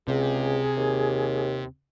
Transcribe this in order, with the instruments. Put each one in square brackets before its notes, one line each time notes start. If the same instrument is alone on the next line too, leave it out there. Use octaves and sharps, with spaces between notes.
[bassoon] C#2 [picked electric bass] C3 [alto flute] G#4
[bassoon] D#2